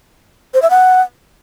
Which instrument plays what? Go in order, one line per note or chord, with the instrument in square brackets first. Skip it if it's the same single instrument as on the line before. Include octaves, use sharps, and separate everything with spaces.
[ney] C5
E5
F#5